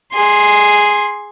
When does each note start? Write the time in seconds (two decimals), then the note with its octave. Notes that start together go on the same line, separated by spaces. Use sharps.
0.13 G#4 C6